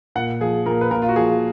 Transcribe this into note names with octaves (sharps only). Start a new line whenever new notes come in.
A#2 F#5
F3 G#4
A#2 A#4
B4
A#2 A#4
F4
F#4
F3 G#4